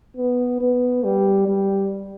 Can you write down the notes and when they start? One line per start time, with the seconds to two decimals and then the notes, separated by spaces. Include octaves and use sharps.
0.17 B3
0.61 B3
1.04 G3
1.48 G3